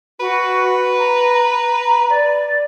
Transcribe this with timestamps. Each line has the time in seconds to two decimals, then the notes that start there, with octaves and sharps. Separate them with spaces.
0.20 F#4 B4
0.99 A#5
1.32 A#5
2.10 D5